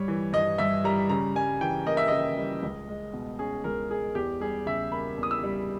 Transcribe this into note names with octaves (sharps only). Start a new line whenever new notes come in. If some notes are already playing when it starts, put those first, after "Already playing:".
Already playing: G2 G3 C#5
E3
G2 D#5
G2 E5
G3 A#5
C#3 A#5
G3 G#5
E3 G5
A#3 D#5
E5
C#3 D#5
G3
C#2
G#3
B2
C#4 G#4
C#2 A#4
G#3 G#4
E2 G4
G3 G#4
C#3 E5
A#3 B5
E2
D#6
E6
G3